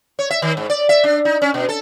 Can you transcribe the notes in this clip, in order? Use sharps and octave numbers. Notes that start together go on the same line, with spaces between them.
C#5
E5
D#3
G#2
D5
E5
D4
D#4
C#4
B2
A4